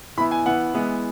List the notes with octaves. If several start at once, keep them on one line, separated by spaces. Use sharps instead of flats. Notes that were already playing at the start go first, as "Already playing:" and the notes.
E3 B3 E4 B5
G#5
E3 B3 E4 F#5
E3 G#3 B3 E4